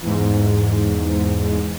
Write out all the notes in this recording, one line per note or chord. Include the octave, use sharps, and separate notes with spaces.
E2 G#2